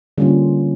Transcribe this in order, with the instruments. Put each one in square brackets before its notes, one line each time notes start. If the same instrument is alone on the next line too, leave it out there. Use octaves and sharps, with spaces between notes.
[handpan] D3 G3 A#3 C#4 F4